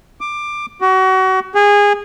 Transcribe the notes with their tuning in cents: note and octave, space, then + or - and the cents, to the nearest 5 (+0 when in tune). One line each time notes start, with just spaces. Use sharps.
D6 +15
F#4 +30
G#4 -20